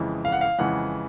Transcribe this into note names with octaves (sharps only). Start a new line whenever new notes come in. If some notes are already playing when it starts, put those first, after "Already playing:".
Already playing: F2 C#3 E3 G#3
F5
F#5
F5
F2 C#3 E3 G#3 F#5